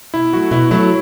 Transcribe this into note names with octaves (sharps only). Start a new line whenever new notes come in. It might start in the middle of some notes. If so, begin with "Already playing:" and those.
B2 E4
F#3 A3 F#4
B2 E4
F#3 A3 E4